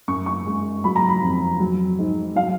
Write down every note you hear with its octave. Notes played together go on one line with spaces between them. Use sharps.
F#2 C#6
C#6
G#3
F#3 B5
A#5
B5
F2
F#3
G#2
F#3 F5